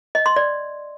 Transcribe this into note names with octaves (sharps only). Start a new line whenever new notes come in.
D#5
C6
D5